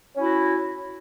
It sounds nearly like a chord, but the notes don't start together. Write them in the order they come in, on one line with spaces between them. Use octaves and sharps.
C#4 E4 F#4